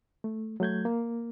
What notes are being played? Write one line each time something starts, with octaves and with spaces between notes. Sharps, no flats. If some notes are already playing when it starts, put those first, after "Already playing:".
A3
F#3 A3 G6 G#6
A#3